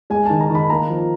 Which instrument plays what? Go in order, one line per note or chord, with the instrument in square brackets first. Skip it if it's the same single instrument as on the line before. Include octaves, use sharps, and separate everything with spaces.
[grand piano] G#3 G#5
D#3 A5
A#5
D#3 B5
A#3 A#5
F3